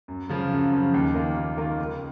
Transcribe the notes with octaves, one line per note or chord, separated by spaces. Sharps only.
F#2
C#3 F3
F#2
C#3 F3
D#2
D#3 A#3 F4 A#4
D#2
D#3 A#3 F4 A#4
C#2